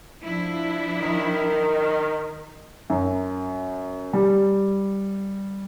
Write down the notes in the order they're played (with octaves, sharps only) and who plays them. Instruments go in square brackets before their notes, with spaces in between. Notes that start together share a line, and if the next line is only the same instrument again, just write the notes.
[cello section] F3 D4 E4
[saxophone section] D#3
[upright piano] F#2
G3